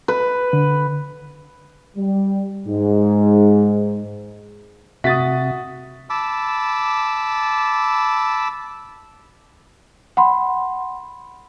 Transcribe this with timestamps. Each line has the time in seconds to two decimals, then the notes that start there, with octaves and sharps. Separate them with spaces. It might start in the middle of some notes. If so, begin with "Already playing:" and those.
0.08 B4
0.53 D3
1.97 G3
2.66 G#2
5.04 C3 F#4 E5 D#6 A6 B6
6.10 A5 B5 D6 E6
10.17 F#5 B5 C6